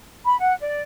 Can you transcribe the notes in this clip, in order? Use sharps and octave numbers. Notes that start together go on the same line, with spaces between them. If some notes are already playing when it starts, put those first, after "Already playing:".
B5
F#5
D5